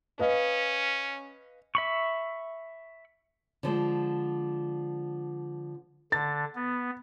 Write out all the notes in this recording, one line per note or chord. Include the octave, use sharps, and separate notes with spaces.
C#4 B4 D#5 F5
E5 B5 C#6
D3 F3 G#3
D3 A6
B3